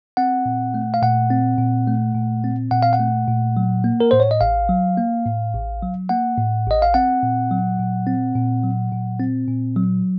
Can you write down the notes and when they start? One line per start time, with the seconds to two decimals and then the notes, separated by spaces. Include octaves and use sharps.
0.17 C4 F#5
0.46 A#2
0.74 A3
0.94 F5
1.03 A#2 F#5
1.30 C4
1.58 A#2
1.87 A3
2.14 A#2
2.44 C4
2.71 A#2 F#5
2.82 F5
2.93 F#5
3.00 A3
3.28 A#2
3.57 F#3
3.84 A#3
4.00 A#4
4.11 A2 C5
4.20 C#5
4.31 D#5
4.41 A1 F5
4.69 F#3
4.97 A#3
5.26 A2
5.54 A1
5.82 F#3
6.09 A#3 F#5
6.38 A2
6.67 A1 D#5
6.82 F5
6.94 C4 F#5
7.23 A#2
7.51 F#3
7.79 A#2
8.07 C4
8.36 A#2
8.63 F#3
8.92 A#2
9.20 C4
9.48 A#2
9.76 F#3